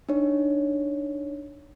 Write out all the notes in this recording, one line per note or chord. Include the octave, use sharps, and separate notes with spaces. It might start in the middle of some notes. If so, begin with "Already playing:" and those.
D4 D#4 C#5